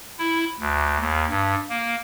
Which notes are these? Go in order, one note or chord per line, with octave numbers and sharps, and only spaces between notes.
E4
D2
D#2
G2
A#3